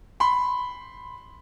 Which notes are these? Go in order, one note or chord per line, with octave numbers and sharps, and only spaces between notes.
B5 C6